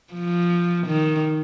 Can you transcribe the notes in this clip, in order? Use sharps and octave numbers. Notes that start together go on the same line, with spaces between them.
F3
D#3